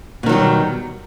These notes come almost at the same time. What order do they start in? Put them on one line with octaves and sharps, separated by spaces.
B2 D#3 F#3 G3